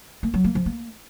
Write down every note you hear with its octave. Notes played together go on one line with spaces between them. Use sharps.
A#3
F#3
A#3
F3
A#3